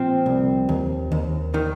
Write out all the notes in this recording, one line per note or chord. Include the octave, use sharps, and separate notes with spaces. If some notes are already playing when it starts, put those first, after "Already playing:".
Already playing: A#2 F3 C4
C2
D#2
D#2
D#3